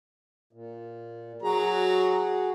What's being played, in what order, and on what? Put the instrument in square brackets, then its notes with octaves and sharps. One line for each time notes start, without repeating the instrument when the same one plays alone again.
[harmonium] A#2
[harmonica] F#3 A#5 [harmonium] F#4 G#4